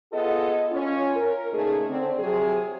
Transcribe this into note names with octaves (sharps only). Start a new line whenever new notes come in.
B3 F4 G#4 A4 D#5
C#4 F4
A#4
A#2 C#3 A3 D#4 G#4
D3 C4
C3 F3 F#3 G#4